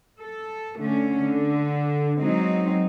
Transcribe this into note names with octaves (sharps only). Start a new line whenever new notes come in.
A4
D3 A3 C#4
D3
F#3 G#3 C4 D#4